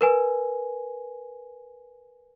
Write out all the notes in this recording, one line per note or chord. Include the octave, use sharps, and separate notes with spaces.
A#4 B4 G#5